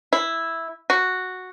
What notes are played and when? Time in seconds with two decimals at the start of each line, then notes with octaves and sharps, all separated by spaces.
0.13 E4
0.90 F#4